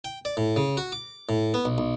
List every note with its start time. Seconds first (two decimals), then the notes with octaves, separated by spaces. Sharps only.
0.04 G5
0.25 D5
0.37 A2
0.56 C#3
0.77 F#4
0.92 D6
1.29 A2
1.54 B3
1.65 B1
1.78 B1